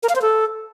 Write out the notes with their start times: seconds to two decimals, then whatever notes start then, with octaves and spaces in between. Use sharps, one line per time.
0.03 A#4
0.09 F5
0.15 C5
0.22 A4